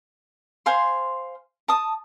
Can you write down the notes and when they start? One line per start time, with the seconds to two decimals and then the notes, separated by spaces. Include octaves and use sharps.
0.66 C5 F5 G#5 C6
1.68 A5 D#6